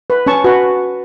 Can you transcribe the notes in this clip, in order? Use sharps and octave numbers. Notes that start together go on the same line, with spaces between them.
B4
C#4 A5 C#6
F#4 B4